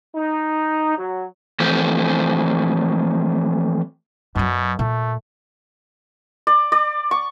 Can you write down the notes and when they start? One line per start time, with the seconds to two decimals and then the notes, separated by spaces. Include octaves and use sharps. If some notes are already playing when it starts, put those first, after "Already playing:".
0.15 D#4
0.98 F#3
1.60 E3 F3 A3 C4 C5
4.35 F#2 B2 F#3
4.79 A#2 A3
6.47 D5
6.72 D5
7.11 C#6